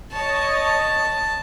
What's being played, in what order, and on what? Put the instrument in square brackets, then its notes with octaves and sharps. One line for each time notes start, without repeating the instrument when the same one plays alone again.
[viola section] C#5 D#5 [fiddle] A5